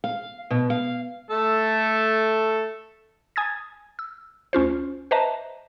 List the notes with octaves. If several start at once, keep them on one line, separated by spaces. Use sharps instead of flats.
F5
B2
F5
A3 A4
G#5 D#6 G#6 A6
E6
D2 C#4 F4 C5
B4 C5 D#5 E5 A5 A#5